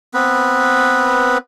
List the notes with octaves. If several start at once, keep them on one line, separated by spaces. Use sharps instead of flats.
B3 C4 B4